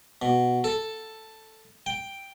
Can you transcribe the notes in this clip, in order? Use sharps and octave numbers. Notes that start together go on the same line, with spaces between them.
B2
A4
G5